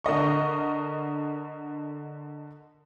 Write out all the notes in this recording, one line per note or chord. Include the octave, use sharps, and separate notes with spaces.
D3 A#4 D#5 C#6